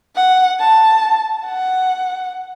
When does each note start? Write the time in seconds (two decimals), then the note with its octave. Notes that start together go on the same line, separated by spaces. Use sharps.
0.16 F#5
0.60 A5
1.46 F#5